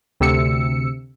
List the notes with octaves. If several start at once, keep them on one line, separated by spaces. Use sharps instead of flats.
D2 C3 E6 C#7